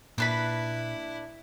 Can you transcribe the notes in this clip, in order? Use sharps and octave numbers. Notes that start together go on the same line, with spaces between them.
A#2 D4 E4 B4 B5